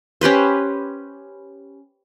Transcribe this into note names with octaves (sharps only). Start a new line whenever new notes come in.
C#4 G4 B4 C5